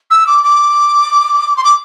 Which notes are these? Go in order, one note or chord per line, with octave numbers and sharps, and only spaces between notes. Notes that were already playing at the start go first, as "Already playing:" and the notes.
E6
D6
D6
C6
D6